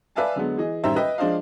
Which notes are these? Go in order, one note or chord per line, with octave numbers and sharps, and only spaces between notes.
B4 D5 E5 F5 G#5 A5
D3 F#3 G#3 B3
E3 G#4 D#5
A1 D#3 G3 C5 E5 A#5
B4 D#5 E5 G5
F3 G#3 D4 C5 D#5 F5